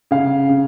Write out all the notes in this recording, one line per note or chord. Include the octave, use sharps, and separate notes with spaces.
C#3 F5
C#3